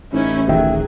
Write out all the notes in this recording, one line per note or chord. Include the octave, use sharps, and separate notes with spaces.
A1 C#4 D#4 E4
D1 D#3 F#3 G#4 E5 G5